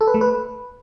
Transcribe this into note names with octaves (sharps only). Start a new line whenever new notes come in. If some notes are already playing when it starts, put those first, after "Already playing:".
A4
B4
A3
B4